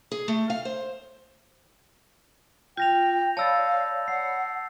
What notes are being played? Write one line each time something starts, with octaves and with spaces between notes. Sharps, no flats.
G#4
A3
F5
C5
F4 G5 G6 A#6 F7
C#5 D5 F5 A5 B5 E6 A6
F#5 C7